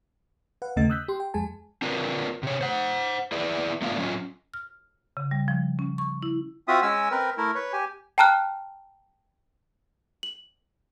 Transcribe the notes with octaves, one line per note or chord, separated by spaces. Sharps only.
B4 F5 F#5
D#2 C#3 A3 D#5 A6
D#6 E6 F#6 G6 B6
G4 C6
G5
F2 G#3 G#4 G#5 A5
C4 D4 F4 A#4 B4
C3 C#5
C5 F#5
E4 G#4 B4 D5
A3 B3 D4 F4 F5
D3 F#3 C#4 F4
F6
C#3
G3
F3
C#4
C#6
E4
C4 F4 F#4 E5 D#6
G#3 C#4 G#5 E6
C4 A#4 B4
A3 E4 A#4
B4 C#5
G4 G#5
G5 A5 A#5 F6 F#6
F#7